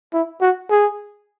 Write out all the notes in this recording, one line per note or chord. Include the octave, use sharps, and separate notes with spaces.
E4
F#4
G#4